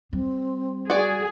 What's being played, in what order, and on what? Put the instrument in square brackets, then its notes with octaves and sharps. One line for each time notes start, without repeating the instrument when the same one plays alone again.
[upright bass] G3 [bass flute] C4
[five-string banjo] F#4 D5 [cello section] G#4